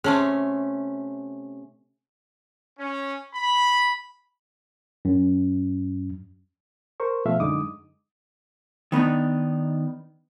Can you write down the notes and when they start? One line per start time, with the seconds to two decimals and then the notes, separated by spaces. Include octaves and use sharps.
0.04 C3 A3 C#4 G#4 A5 C6
2.79 C#4
3.34 B5
5.05 F#2
7.00 A#4 C5 C#6
7.26 B2 F3 A3 E5 F5
7.40 F#2 D3 G#3 D#4 D6 D#6
8.92 D#3 B3 D4 D#4